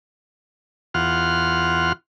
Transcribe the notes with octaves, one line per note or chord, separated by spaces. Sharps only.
E2 F4 F#5 C6 F6